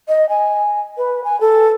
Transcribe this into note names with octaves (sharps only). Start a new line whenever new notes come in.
D#5
G#5
B4
G#5
A4